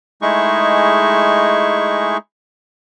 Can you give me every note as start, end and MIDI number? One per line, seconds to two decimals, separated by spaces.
0.22 2.17 56
0.22 2.17 57
0.22 2.17 63
0.22 2.17 64
0.22 2.17 68
0.22 2.17 85